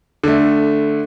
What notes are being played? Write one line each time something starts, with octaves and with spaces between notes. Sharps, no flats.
D3 A3